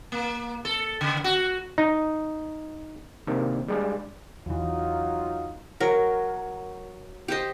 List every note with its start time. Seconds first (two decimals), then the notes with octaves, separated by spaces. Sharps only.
0.12 A#3
0.65 A4
1.01 C#3
1.24 F#4
1.78 D#4
3.27 C3 D#3 A#3 C4 D4
3.68 G3 G#3 D4
4.46 E2 E3 F#3 D#4 F4
5.80 F#3 A#4
7.28 G4 C5 D#5